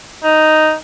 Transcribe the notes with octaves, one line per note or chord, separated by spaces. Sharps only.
D#4